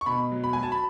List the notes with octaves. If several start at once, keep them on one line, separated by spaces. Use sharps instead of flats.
C#6
B2 B5
F#3
B5
F#3 G#5
A5
B5